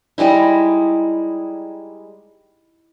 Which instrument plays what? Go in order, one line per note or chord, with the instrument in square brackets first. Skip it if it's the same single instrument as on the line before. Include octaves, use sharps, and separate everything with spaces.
[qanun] G3 G#3 D#4 E4